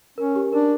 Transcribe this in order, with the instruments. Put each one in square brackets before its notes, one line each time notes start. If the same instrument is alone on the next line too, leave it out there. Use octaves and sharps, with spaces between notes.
[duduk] C#4 [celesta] A#4
[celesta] G4
[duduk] D4 [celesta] A#4